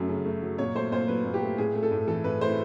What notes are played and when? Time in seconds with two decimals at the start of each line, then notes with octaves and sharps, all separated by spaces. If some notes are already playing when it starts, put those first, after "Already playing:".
Already playing: F#2 F#3 A3
0.09 C#3
0.25 A3
0.42 F#3
0.58 A#2 C#5
0.75 A3 C5
0.92 A#2 C5
1.08 F#3 B4
1.25 A#2
1.34 G4
1.42 A3
1.58 A2 G#4
1.75 A3
1.83 A4
1.91 A2
2.07 E3 A4
2.24 A2 B4
2.41 A3 C5